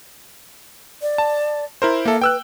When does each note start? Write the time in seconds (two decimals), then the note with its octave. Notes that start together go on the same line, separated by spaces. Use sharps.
1.02 D5
1.18 A5
1.82 E4 A#4 C5
2.05 A#3 A4 E5
2.22 B4 G5 E6 F#6